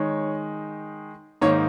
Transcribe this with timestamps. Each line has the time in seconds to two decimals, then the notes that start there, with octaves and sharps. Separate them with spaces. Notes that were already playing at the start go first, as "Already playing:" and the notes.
Already playing: D#3 G#3 D#4 C#5
1.41 G#2 D#3 A#3 D#4 C#5